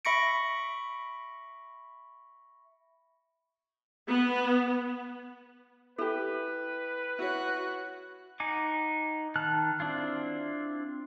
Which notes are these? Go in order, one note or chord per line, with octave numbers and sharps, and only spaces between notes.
E5 B5 C#6 A#6 C#7 D7
B3
E4 G4 A4 B4
E4 F#4 C#5 F#6
D#4 F#5 G#5 D6
D#3 A5 F6 F#6
C4 D4 E4 F4